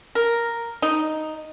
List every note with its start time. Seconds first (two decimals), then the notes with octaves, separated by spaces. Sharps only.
0.15 A#4
0.82 D#4